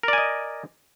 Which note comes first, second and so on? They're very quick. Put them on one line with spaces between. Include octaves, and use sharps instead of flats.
A#4 D5 G#5 D#5